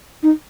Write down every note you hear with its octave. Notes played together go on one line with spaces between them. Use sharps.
D#4